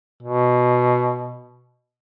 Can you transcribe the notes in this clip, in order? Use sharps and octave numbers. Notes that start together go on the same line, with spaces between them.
B2